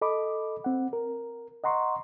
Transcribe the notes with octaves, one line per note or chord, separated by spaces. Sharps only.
A4 D#5 B5 D6
C4 F#5
A#4
D#5 F#5 A#5 C6 C#6